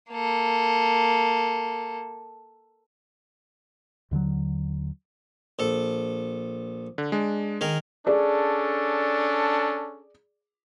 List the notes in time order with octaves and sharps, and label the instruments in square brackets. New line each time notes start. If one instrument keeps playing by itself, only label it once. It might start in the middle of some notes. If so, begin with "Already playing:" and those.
[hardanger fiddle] A#3 A4
[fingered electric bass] D#2 D3 D#3 F#3
[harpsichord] A#1 A4
[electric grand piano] D3
G#3 D4
[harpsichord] D#3 G#4 A#4
[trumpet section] C#4 D4 A4 [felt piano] G#4 D5